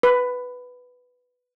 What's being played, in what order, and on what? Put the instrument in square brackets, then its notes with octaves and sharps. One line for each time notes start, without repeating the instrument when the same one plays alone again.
[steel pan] B4